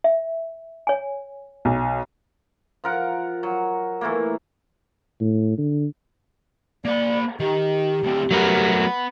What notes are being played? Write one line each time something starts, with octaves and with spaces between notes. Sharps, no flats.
E5
C#5 G#5
B1
F3 A#4 F#5
F#3
E3 A3 A#3
A2
D3
A#3 D5 B5
D#3 G4
D2 C4
F#3 A3 B3 A#4